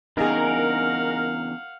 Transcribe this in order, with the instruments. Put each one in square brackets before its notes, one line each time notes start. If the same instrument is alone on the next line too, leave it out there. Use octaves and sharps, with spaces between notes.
[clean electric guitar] E2 G2 C#3 [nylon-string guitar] D#4 G#4 [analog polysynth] A#4 [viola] F5 F#5